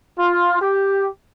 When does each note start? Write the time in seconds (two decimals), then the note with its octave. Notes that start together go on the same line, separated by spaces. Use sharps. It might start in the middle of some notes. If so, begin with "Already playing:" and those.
0.18 F4
0.62 G4